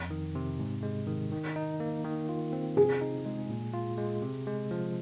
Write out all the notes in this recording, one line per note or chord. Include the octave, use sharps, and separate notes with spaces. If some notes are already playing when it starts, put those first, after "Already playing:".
Already playing: F2
D#3
C3
G#2
G#3
D#3
D#3
D#4
A#3
D#3
F4
C4
C3 G#4
D#4
G#3
A#2
F4
G#3
C3
G#3
F3